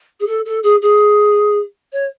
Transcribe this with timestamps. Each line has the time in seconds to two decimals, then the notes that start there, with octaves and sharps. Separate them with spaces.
0.20 G#4
0.26 A4
0.45 A4
0.63 G#4
0.82 G#4
1.92 C#5